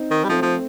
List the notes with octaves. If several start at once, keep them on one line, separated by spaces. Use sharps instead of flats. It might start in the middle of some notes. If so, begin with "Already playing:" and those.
Already playing: C4 D#4
D#3
G3
F3 A3 C4
F3